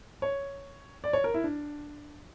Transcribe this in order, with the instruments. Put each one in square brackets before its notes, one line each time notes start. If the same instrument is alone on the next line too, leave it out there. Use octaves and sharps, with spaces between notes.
[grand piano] C#5
D5
C#5
A#4
E4
D4